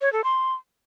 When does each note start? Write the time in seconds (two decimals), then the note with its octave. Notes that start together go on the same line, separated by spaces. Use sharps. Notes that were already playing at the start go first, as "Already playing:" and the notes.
0.01 C#5
0.13 A4
0.24 C6